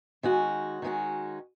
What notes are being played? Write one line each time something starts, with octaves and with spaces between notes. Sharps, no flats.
D#3 G#3 C#4 F#4
D#3 G#3 C#4 F#4